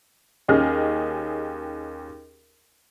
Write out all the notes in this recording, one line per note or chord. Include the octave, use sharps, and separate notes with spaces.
D#2 C#4 G4 G#4 D#5 F6